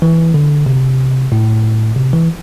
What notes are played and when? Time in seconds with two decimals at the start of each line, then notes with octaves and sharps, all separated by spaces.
0.02 E3
0.34 D3
0.66 C3
1.32 A2
1.97 C3
2.13 E3